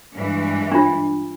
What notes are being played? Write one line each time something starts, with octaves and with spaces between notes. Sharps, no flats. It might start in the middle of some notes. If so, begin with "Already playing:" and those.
G2 E3 G#3
D4 F4